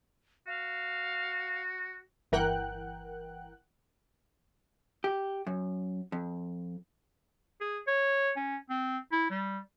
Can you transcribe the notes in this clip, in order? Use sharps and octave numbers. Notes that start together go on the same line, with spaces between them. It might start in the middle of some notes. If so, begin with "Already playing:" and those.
F#4 F5
G1 E3 A#4 F#5 G5 F#6
G4
F#2
F2
G#4
C#5
C#4
C4
E4
G3